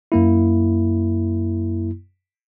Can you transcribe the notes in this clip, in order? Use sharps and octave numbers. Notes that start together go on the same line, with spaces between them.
F#2 A#3 E4